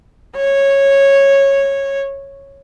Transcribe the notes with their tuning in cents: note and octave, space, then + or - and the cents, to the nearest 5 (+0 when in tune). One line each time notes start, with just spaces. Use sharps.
C#5 -10